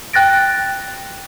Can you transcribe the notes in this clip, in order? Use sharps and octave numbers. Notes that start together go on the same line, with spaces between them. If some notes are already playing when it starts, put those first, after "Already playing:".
G5 F#6 A6 A#6 D7